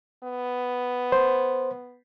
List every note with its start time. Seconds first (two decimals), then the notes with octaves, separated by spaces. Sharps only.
0.23 B3
1.12 C5